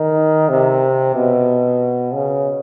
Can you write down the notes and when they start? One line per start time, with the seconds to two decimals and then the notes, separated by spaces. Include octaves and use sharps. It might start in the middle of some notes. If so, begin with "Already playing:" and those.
Already playing: D#3
0.49 C3
1.15 B2
2.14 C#3